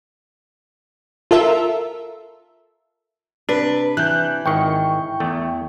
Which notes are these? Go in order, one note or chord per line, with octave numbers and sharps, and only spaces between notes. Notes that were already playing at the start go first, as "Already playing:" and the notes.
F4 A4 A#4 E5
C3 D4 B4
E3 F#6 G6
G#1 D#3 G5 C#6
E2 A3